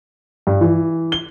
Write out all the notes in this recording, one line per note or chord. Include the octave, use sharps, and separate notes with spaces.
G2
E3
G7